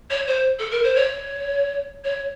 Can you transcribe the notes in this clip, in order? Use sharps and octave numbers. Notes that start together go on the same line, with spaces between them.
C#5
C5
A4
A#4
C5
C#5
C#5